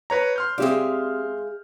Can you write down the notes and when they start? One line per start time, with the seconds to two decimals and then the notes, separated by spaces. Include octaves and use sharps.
0.10 B4 C#5 A#5
0.36 C6 F6 G6
0.58 G#3 C4 G4 D5 E5 F5